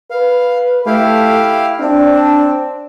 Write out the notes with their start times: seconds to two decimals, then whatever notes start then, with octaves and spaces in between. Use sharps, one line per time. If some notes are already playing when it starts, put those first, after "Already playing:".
0.11 B4 F5
0.86 A3 E4 G4 F5
1.80 C4 D4